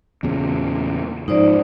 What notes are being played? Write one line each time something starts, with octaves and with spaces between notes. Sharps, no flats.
E2 A#2 C#3
G#2 F3 D#4 C5 D5